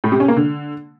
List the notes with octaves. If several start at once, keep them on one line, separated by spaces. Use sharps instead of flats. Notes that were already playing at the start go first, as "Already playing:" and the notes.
A2
C3
C#4
A#3
D3